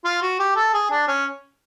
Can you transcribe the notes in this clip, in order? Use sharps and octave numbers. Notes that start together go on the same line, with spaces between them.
F4
F#4
G4
A4
G#4
D4
C#4